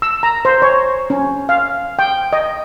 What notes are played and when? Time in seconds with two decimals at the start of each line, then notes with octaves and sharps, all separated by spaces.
0.02 E6
0.23 A#5
0.45 C5
0.62 C#5
1.10 C#4
1.49 F5
1.99 G5
2.33 D#5